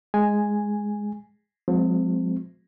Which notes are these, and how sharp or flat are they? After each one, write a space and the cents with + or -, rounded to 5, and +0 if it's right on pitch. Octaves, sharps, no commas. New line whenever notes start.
G#3 +0 G#5 +0
F3 +45 G#3 +0 C4 -15